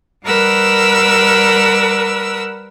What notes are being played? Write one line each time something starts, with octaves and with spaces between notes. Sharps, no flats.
G3 A#4 B4 F#5 E6